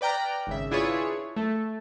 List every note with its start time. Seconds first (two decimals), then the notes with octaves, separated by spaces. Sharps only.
0.01 B4 D5 G5 A#5 F6
0.47 G#1 C#3 E5
0.71 D4 E4 F4 G#4 B4 C#5
1.36 A3 A4